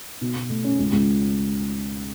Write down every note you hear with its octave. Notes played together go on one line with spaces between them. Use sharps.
B2
B2
A3
C#4
C#2
C#2